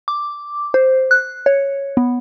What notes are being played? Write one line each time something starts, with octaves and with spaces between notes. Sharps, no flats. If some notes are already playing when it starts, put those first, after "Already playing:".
D6
C5
F#6
C#5
B3